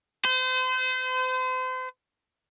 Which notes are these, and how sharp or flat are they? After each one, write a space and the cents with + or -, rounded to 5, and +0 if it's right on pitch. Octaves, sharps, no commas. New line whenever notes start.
C5 -35